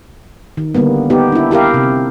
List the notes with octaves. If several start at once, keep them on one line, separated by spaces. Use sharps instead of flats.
D#3
D3 G3 A#3 B3
B3 D#4 G4
D4 E4
E4 G4 A#4 F5
C3